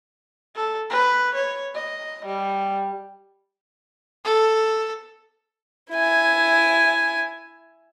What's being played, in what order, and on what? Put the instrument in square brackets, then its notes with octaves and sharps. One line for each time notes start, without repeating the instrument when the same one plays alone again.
[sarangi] A4
B4
C#5
D#5
G3
[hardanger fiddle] A4
E4 G#5